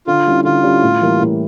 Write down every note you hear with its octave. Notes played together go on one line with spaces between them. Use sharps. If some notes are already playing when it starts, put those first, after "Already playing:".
D3 F4
G3 C#4 E4
D3 F4
G3 C#4 E4
A2
E3 G3 A#3
A2